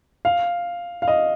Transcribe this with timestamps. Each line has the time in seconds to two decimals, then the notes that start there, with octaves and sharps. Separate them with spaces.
0.25 F5
1.02 F5
1.08 D#5